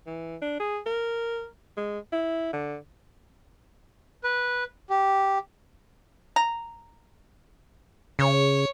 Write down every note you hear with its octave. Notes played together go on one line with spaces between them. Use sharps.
E3
D4
G#4
A#4
G#3
E4
D3
B4
G4
A#5
C#3 C#5